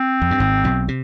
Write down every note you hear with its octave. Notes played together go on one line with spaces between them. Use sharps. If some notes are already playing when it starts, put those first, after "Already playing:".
Already playing: C4
F2
G2
G#1 G#2
B1 B2
C3